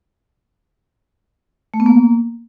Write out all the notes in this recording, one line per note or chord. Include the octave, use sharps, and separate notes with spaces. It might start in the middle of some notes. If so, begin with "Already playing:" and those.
A3
B3
A#3